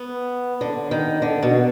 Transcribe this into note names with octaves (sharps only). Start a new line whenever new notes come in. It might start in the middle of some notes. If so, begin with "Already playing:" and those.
Already playing: B3
D3
D#3
D3
B2